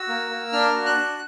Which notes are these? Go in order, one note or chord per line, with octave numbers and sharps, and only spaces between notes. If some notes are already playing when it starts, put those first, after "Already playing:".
Already playing: F#4 E6
A#3
A#3
D4 F6
F#4
F#6
D4